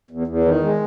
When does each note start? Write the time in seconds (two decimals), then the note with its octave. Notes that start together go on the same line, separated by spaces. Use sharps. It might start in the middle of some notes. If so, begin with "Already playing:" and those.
0.11 E2
0.27 E2
0.45 D#3
0.63 G#3